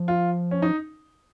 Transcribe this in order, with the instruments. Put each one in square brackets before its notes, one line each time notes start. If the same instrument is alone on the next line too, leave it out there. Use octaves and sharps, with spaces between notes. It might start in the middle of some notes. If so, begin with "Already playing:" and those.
Already playing: [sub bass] F3
[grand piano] F4
C#4
D#4